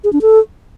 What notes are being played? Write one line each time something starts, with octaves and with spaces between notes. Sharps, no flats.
G#4
D4
A4